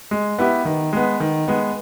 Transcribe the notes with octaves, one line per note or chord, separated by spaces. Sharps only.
G#3
B3 E4 G4
D#3
G#3 B3
D#3
G#3 B3